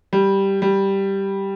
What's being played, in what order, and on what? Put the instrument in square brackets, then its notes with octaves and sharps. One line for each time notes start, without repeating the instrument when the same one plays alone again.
[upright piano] G3
G3